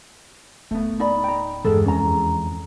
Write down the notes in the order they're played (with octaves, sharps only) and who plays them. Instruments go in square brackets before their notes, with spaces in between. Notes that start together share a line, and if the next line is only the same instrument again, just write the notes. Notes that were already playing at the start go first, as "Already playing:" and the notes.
[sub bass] D1 [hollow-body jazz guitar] A3 B3
[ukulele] D#4 D5 B5
[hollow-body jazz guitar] G5 A#5
[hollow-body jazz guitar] E2 G#3 [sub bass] G2 [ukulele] A4
[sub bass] F2 [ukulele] C#4 A#5